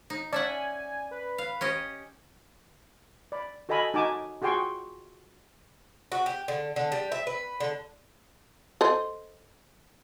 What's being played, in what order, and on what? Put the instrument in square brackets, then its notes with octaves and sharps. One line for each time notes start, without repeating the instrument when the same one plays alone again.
[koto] D#4
[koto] C#4 E5 F#5 [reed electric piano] D5 [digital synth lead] A5
[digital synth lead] G#5
B4
[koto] F5
C#4 G4 D#5
[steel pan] D5 B5
F#4 A4 D#5 G#5 B5
D#4 F#4 G#5 A5 D6
F4 F#4 G#4 G5 C6 C#6
[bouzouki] F#4
G4
D3
D3
G3
E5
B4
D3
[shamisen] A4 C5 D#5